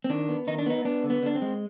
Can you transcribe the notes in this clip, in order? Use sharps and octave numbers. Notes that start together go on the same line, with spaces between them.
C4
D#3 D4
B3
D#3 D#4
D4
B3 D#4
B3 D4
D3
B3
D3 D4
C4
G#3